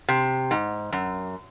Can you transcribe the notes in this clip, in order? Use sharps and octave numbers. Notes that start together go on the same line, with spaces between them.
C3
G#2
F#2